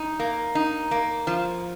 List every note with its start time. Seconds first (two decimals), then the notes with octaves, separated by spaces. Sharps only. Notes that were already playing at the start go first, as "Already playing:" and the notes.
Already playing: D#4
0.20 A#3
0.55 D#4
0.91 A#3
1.27 F3